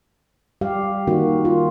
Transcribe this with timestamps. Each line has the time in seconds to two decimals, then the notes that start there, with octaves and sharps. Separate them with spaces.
0.61 G3 G4 F5
1.07 D#3 A#3 F#4
1.45 F4